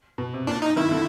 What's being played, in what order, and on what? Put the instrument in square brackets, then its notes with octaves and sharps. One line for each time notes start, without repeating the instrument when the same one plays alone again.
[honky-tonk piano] B2
C3
[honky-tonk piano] A#2 [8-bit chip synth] D4
[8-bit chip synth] D#4
[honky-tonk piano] D#3 [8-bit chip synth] E4
[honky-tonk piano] D3